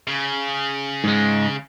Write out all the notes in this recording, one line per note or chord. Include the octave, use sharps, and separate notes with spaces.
C#3
G#2 G#3